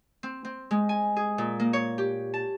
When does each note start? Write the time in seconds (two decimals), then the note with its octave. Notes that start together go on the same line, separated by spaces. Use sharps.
0.23 C4
0.45 C4
0.71 G#3
0.89 G#5
1.16 G#4
1.38 A#2
1.60 A#3
1.73 C#5
1.98 G4
2.34 A5